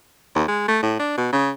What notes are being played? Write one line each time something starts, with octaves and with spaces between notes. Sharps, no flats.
D#2
G#3
A3
A2
D4
B2
C#3